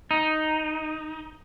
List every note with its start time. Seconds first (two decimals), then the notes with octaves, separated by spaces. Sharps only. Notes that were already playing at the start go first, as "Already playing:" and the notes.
0.11 D#4